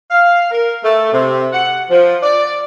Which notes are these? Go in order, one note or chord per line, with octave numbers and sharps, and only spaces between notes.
F5
A#4
A3
C3
F#5
F3
D5